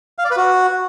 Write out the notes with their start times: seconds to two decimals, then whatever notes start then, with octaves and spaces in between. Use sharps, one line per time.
0.18 F5
0.25 D5
0.31 B4
0.37 F#4